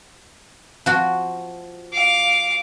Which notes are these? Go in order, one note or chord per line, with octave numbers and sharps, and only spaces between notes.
F3 F#4
F5 D6